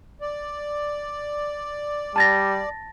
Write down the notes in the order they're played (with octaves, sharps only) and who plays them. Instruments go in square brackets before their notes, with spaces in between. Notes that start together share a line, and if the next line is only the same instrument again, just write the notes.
[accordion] D5
[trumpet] G3 [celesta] A5 A6 A#6